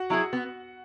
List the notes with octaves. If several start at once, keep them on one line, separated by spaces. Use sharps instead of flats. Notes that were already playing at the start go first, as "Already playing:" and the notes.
Already playing: F#4 F#5
F#3 E4 G#4
B3